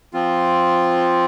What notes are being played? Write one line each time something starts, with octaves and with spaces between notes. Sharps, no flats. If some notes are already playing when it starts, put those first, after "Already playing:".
F3 C4 F4